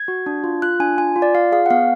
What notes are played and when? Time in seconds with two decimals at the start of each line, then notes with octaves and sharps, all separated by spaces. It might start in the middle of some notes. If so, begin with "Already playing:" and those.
Already playing: G#6
0.08 F#4
0.26 D4
0.44 F4
0.62 F4 F#6
0.80 D4 G#5
0.98 F4 G#5
1.16 F4
1.22 D5
1.35 F4 F5
1.52 G#4 F5
1.66 F#5
1.70 B3 F5